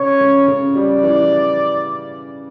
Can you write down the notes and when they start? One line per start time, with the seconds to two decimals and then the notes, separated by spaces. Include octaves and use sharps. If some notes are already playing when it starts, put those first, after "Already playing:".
Already playing: C#3 C#5
0.21 C#3
0.48 C#3
0.76 G3 D5
1.03 E3